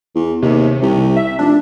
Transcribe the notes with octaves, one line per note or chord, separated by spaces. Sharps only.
E2
D#2 C3
C2
E5
F1 D4